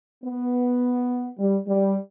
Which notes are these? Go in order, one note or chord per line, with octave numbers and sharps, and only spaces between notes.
B3
G3
G3